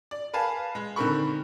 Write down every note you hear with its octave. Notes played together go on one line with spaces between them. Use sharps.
D5
A#4 B4 F5 G#5 A5
G#3
D3 D#3 C4 A#4 B5 C#6